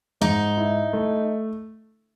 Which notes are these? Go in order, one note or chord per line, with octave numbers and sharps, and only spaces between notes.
G#2 D#4
E4
A3